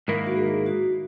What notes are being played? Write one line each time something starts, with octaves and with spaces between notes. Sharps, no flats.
G#2 D#3 A#3 E4 A#4
F#4
G#4
F#4